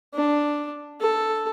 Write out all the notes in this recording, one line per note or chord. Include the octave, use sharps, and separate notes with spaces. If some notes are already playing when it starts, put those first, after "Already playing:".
D4
A4